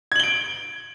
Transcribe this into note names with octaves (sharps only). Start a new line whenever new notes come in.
G#6 D7 F#7 G7